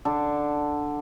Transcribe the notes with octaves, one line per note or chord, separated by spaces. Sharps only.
D3 D4 A4